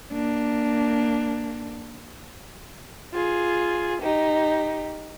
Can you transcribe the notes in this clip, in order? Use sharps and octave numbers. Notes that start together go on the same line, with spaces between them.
A#3 D4
F4 G#4
D#4 G4